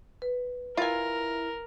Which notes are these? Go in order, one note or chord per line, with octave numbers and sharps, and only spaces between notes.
B4
E4 F4 A#4 G#5